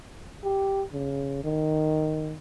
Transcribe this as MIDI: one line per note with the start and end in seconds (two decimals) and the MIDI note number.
0.44 0.83 67
0.93 1.43 49
1.44 2.35 51